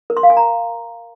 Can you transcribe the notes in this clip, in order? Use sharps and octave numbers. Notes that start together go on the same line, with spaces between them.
A#4
C6
F5
G#5
A#5